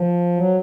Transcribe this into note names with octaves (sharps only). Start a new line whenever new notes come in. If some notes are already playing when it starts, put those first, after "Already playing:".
Already playing: F3
F#3